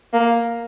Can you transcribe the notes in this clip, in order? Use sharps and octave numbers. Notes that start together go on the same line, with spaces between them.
A#3